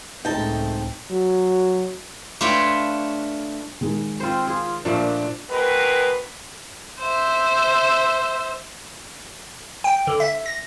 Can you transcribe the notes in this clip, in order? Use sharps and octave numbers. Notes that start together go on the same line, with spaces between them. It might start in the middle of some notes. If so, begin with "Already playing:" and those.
C#2 A2 G#3 A3 C4 D#4 G5 A5
F#3
A3 D4 F4 B4 C#5 G5
D#3 G#3
C4 F4 C5
F4 G#4
A#2 F3 A3 A#3 D4
B2 G#3 C4 A#4 B4
C5 E5
G5
D3
E5
A#6